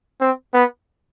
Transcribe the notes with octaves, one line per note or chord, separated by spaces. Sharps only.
C4
B3